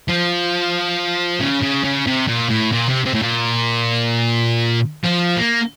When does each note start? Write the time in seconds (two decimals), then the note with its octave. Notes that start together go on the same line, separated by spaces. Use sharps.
0.08 F3
1.40 C#3
1.62 C#3
1.84 C#3
2.07 C3
2.28 A#2
2.50 A2
2.73 A#2
2.89 C3
3.06 C3
3.14 A2
3.22 A#2
5.04 F3
5.36 A#3